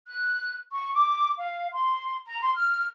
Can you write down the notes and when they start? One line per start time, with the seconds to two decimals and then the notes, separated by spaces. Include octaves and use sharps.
0.07 F#6
0.72 C#6
0.94 D6
1.37 F5
1.73 C6
2.27 A#5
2.42 C6
2.54 F6